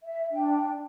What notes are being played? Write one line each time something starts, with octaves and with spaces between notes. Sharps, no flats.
E5
D4 G5